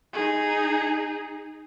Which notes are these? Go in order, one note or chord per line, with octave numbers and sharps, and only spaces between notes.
D#4 G#4